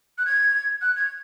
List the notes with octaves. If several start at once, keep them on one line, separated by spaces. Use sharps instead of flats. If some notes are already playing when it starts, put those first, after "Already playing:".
F#6
G#6
F#6
G#6